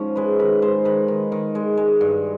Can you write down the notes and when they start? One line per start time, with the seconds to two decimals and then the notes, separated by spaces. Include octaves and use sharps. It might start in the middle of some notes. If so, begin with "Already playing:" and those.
Already playing: G#2 F3 C#4 F4
0.16 G#3 B4
0.39 D#3 B4
0.62 G#3 C5
0.85 D#3 B4
1.08 D#3
1.32 D#3
1.55 G#3
1.77 G#3
2.01 G2